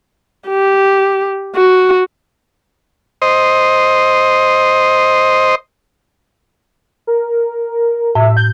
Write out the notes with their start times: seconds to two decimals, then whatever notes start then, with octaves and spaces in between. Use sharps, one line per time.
0.49 G4
1.56 F#4
3.22 C5 D#5
7.07 A#4
8.15 A2 E5
8.37 G6